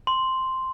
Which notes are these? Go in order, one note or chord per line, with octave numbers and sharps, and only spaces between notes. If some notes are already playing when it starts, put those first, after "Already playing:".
C6